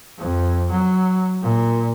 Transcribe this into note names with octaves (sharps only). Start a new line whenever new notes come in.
F2
F#3
A#2